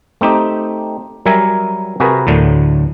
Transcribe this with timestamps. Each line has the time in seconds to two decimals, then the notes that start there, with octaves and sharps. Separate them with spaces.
0.21 A3 C4 D#4 G4
1.26 F#3 G3 A#4 E5 G#5 A#5
2.00 C3 F#4 G#4 A#4 B4
2.27 D2 A2 D3 F#3